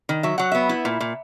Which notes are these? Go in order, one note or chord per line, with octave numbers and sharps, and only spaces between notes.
D#3
F#3 E5
F#3 F#5
B3 E5
E4
A#2
A#2